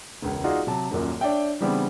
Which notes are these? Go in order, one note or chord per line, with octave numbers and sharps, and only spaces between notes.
E1 C#2
D#4 F4 F#4 G#4 D5
C3 F#3 A5
D#1 F#2 A#2
D4 C#5 D5 E5 G5
C#3 E3 G3 B3 C4 D4